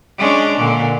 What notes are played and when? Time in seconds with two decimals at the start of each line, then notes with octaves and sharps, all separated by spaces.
0.18 G#3 C#4 D4
0.58 A#2 D3